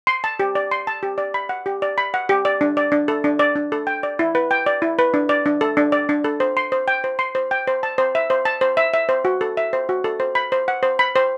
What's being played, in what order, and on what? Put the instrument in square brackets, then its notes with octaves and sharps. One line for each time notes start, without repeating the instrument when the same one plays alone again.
[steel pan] C6
A5
G4
D5
C6
A5
G4
D5
B5
F#5
G4
D5
B5
F#5
G4
D5
D4
D5
D4
A4
D4
D5
D4
A4
G5
D5
E4
B4
G5
D5
E4
B4
D4
D5
D4
A4
D4
D5
D4
A4
C5
C6
C5
G5
C5
C6
C5
G5
C5
A5
C5
E5
C5
A5
C5
E5
E5
C5
F#4
A4
E5
C5
F#4
A4
C5
B5
C5
F#5
C5
B5
C5